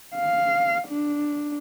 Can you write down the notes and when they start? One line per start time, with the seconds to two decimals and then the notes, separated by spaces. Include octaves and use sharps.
0.16 F5
0.88 D4